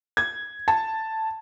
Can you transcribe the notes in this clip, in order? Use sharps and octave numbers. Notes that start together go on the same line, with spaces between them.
G#6
A5